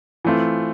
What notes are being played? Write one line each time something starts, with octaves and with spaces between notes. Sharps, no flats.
E3 A3 C4 F4